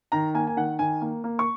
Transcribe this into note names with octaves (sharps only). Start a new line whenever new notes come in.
D#3 A#5
A#3 G#5
G#5
D#3 F#5
D#3 G#5
A#3
A#3
C#6